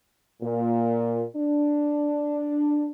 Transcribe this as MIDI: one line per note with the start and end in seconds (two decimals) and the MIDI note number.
0.42 1.23 46
1.36 2.90 62